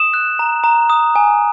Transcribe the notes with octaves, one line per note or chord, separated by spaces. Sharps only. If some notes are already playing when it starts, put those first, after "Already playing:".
Already playing: D#6 E7
F#6
A#5
A#5
D#6
G#5